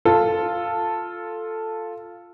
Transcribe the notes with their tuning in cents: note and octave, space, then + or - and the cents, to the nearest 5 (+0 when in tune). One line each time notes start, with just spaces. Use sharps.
F4 +0 A4 +0